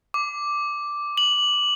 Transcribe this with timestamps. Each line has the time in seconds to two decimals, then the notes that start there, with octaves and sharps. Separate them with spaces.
0.14 D6
1.18 F#7